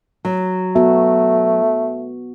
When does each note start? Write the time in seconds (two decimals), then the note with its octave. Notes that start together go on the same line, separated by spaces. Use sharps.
0.25 F#3
0.76 A3 B3 F#4